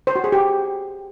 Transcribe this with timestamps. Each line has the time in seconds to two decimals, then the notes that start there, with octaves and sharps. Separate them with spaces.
0.07 C5
0.16 F#4
0.24 G#4
0.32 G4